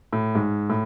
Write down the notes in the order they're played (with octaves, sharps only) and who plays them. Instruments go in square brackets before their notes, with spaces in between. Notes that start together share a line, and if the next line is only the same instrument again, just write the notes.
[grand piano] A2
G#2
A2